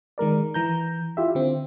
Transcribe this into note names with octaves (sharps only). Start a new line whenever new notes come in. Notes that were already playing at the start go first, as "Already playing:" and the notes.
D#3 G#3 A#4 D5
E3 A#5 G6
E4 F4 G4 E5
D3 C4